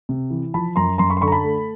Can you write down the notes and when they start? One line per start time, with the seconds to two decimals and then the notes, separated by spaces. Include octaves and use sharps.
0.09 C3
0.30 E3
0.54 F3 A5 B5
0.76 F#2 A#5 C6
0.98 F#2 A#5 C6
1.10 B5 C#6
1.17 C6
1.21 D3 B5 C#6
1.28 A#5
1.32 A5 B5
1.44 A3